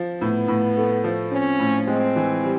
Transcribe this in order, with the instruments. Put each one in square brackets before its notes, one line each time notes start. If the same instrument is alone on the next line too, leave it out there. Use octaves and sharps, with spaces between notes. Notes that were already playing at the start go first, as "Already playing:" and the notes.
Already playing: [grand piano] F3
[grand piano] A2 [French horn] B3
[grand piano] A2
A3
F3
[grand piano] C4 [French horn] C#4
[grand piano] A2
[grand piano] G#3 [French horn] C4
[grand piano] E3
G3